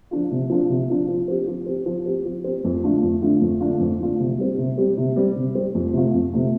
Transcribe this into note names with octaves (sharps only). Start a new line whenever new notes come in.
F3 D4 F4
C3
F3 D4 F4
C3
F3 D4 F4
F3
C4 G4
F3
C4 G4
F3
C4 G4
F3
C4 G4
F2
D3 A3 D4 F4
F2
D3 A3 D4 F4
F2
D3 A3 D4 F4
F2
D3 A3 D4 F4
C3
G3 C4 G4
C3
G3 C4 G4
C3
G3 C4 G4
C3
G3 C4 G4
F2
C3 A3 F4
F2
C3 A3 F4